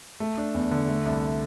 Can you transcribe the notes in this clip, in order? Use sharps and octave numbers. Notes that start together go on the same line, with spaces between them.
A3
D4
E2
D3
A3
C2